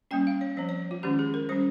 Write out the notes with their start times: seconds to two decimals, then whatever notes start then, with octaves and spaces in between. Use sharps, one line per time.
0.11 G3 A#3 C#4 G5
0.27 F5
0.41 C#5
0.57 F3 C4 C5
0.69 C#5
0.91 F4
1.03 D#3 G#3 C#4 G4
1.19 G#4
1.34 A#4
1.49 G3 C#4 C5